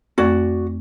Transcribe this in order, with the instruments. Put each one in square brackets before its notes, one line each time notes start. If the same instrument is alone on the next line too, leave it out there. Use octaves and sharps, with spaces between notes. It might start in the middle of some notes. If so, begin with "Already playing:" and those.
[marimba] F2 A3 C4 [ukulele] F#4 D5